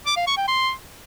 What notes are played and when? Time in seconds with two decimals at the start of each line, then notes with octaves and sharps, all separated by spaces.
0.06 D6
0.17 F5
0.27 C#6
0.37 G5
0.48 C6